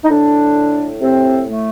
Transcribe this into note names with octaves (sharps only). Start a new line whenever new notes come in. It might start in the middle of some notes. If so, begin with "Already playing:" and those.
D#4
A2 D3 D4
C3 C4
A3